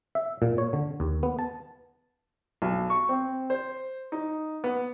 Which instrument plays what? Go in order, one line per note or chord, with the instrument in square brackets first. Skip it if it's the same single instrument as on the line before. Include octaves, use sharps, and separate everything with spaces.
[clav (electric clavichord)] E5
A#2
C#5
D3
D#2
B3
A5
[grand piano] B1
C#6
C4
C5
D#4
B3